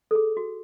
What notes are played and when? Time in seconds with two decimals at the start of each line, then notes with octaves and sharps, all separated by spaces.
0.11 A4
0.15 G#4
0.37 F#4